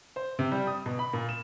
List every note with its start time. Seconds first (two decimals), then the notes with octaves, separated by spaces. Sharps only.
0.16 C5
0.39 C3
0.51 G3
0.67 D#6
0.86 B2
0.99 B5
1.13 A#2
1.29 E7